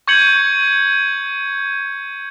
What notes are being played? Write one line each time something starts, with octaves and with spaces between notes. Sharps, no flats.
C#6 G6 G#6 C#7 F#7